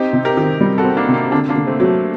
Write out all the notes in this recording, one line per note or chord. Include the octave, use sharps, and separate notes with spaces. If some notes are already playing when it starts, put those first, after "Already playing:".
Already playing: C4 D#4 G4
C3
G4 A#4
D#3
G3
F#4 A4
C4
A#3 D4
C3
A#3
D3 A#3 D4
A#3 D4
D3
A3 C4
F#3 A3